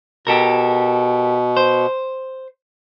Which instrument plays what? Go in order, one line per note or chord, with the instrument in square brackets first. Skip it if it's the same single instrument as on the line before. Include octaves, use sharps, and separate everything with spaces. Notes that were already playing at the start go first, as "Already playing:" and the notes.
[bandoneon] B2 [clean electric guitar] G4 A4 A#4
[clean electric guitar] C5